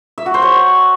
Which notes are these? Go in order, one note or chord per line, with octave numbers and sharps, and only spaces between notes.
E5
F#4
C5
C#5